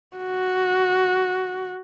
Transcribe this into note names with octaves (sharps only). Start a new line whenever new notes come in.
F#4